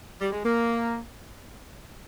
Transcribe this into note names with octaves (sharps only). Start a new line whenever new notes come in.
G3
G#3
A#3